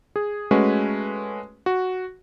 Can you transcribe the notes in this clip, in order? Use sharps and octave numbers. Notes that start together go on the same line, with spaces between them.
G#4
G#3 A3 C#4 F#4 B4 G#5
F#4